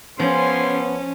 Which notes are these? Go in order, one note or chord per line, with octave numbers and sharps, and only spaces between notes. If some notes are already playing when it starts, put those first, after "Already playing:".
F3 G3 B3 C#4 G#5 C6